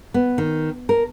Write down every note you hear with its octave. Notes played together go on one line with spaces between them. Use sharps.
B3
D#3
A#4